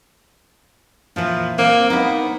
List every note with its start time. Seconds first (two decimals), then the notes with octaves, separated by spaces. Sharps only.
1.16 A#2 E3 F3
1.58 A#3 C4
1.90 B3 D#4 B4